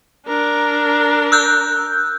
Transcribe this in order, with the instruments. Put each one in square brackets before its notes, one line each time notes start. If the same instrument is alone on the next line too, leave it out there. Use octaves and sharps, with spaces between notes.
[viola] D4 A#4
[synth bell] E6 F#6 G6